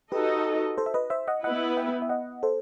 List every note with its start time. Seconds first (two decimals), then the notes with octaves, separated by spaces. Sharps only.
0.12 D#4 F#4 G4 A4 B4 D#5
0.78 A4 C5
0.86 E5
0.94 B4 D#5
1.10 C5 E5
1.28 D#5 F#5
1.43 B3 E4 B4 D#5 F#5
1.77 E5 G5
2.02 E5
2.09 D#5 F#5
2.43 A4 C5